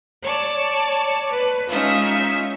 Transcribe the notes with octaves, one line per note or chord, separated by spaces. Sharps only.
C#5 D5 A5
B4
G#3 C#4 D#4 F4 E5